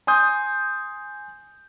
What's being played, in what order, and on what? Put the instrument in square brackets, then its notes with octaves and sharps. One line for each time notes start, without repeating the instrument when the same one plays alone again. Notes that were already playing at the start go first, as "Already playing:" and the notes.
[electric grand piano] G#5 C6 D#6 G6